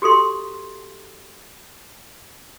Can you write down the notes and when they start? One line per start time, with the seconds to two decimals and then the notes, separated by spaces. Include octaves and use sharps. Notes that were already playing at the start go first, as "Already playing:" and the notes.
0.02 F#4 G4 A4 C6